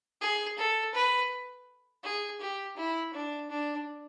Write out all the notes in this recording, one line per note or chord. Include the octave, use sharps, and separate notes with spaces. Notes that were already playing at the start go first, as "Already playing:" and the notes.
G#4
A4
B4
G#4
G4
E4
D4
D4